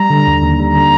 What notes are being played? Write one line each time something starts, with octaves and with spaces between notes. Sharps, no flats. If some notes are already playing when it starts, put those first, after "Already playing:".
Already playing: G3 A#5
D3
D#2
D#2
G3 A#5
D3